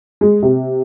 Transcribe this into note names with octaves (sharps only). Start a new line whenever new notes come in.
G#3
C3